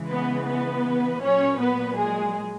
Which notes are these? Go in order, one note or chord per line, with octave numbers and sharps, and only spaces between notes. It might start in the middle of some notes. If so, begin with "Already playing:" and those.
Already playing: C#3 E3 G#3
B3 B4
B3 B4
A#2 F#3 C#4 C#5
B3 B4
G#3 G#4